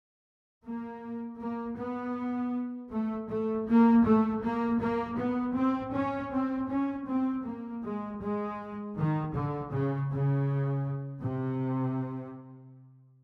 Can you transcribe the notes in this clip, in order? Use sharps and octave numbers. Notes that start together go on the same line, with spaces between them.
A#3
A#3
B3
A3
A3
A#3
A3
A#3
A#3
B3
C4
C#4
C4
C#4
C4
A#3
G#3
G#3
D#3
D3
C#3
C#3
C3